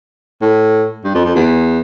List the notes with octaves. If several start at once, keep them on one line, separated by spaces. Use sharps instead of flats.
A2
G2
F2
F2
E2